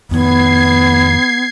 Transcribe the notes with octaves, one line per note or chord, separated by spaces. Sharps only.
F2 D#3 B3 G#6 C7